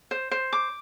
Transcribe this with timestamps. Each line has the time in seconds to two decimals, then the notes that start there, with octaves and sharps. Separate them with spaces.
0.11 C5
0.31 C5
0.53 D6